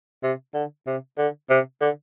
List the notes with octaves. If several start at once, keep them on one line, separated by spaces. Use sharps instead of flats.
C3
D3
C3
D3
C3
D3